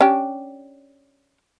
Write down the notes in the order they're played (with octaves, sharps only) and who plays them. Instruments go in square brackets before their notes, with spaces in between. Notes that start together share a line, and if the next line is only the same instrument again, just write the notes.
[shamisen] C#4 D4 G4